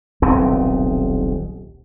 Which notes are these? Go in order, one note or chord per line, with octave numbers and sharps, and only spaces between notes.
D#1 B1 C#3 C4